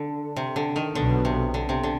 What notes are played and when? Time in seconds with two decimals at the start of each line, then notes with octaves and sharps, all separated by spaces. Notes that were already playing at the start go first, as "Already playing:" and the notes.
Already playing: D3
0.36 C3
0.56 D3
0.76 D#3
0.95 B1 B2 D3 B3
1.25 C3
1.54 D3
1.69 C3
1.84 D3